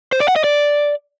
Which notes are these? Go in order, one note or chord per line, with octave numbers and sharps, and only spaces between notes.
C5
D5
F#5
D#5
D5